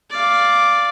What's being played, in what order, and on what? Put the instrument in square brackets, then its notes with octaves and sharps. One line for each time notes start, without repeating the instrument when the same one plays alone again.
[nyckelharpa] D5 F5